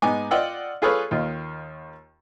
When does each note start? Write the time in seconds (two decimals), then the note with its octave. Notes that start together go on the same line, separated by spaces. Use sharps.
0.02 G#2 B3 D#4 G#5 D6
0.31 F4 D5 D#5 F#5 G5 E6
0.82 F4 G#4 A4 B4 C#5 F5
1.11 D#2 D#3 F4